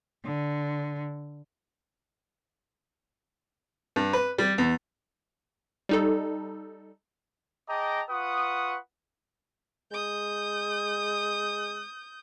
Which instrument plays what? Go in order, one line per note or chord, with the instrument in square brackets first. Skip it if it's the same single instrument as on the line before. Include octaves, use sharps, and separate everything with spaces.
[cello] D3
[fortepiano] G2
B4
G3
E2
[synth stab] G3 D#4 A4
[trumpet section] G#4 D#5 G5 A5 A#5 D6
F4 B4 F#5 C#6 D#6
[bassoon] G#3 [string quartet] D#6 G6